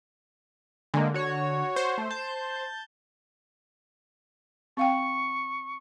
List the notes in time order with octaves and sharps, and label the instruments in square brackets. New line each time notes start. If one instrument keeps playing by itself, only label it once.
[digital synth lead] D3 [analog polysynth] G#3 A#3
[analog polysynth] F#4 C#5
[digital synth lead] C5
[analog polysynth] A3
A5 G6
[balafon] C4 F5 G5 [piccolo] C#6